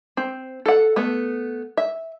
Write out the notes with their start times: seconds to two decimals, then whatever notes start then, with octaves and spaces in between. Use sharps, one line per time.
0.17 C4
0.66 A4 F#5
0.96 A3 B3
1.77 E5